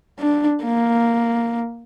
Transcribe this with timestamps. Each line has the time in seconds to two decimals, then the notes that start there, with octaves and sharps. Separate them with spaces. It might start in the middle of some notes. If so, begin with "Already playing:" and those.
0.19 D4
0.64 A#3